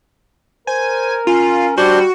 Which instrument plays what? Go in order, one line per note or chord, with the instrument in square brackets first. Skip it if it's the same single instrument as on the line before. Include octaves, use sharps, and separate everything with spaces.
[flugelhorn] A#4 [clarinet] C5 [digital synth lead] G#5
[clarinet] C#4 [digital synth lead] F4
[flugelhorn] G3 [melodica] D4 C5 C6 [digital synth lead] F#4